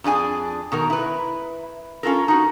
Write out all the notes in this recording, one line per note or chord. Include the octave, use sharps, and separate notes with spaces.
F2 D4 G#4 G#5
B2 D#3 A#4
E4 B4
C#4 F4 A4 A#4
D#4 F#4